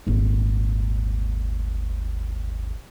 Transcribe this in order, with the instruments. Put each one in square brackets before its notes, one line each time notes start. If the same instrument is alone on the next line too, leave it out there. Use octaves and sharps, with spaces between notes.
[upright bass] D#1 G#1